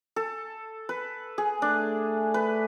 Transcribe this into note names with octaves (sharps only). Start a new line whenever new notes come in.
A4
B4
G#4
A3 D4
B4